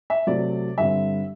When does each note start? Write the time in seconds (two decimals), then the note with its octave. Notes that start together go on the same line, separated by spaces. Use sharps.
0.10 E5
0.27 C3 F#3 A3 D5
0.78 G2 D3 G3 C4 E5